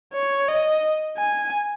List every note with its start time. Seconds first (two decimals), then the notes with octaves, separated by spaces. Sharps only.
0.13 C#5
0.49 D#5
1.17 G#5